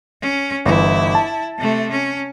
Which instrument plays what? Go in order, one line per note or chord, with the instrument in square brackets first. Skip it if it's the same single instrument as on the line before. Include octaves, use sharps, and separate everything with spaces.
[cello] C#4
[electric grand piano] G1 E3 [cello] E4
[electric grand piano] A5
[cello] C3 A3
C#4